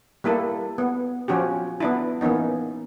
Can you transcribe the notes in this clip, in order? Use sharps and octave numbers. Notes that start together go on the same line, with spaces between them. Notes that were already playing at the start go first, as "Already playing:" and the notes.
G3 A#3 E4 A4
B3
F3 C#4 F#4 G4
B3 D4 E4
E3 A#3 B3 C#4 D#4